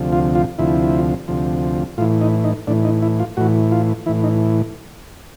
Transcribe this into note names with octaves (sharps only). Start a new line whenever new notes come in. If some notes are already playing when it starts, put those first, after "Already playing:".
Already playing: D2 C3 F3
F4
F4
D2 C3 F3 E4
D2 C3 F3
A2 E3 F4
D#4
D#4
A2 E3 D4
D#4
E4
F4
A2 E3 F#4
F4
A2 E3 E4
D#4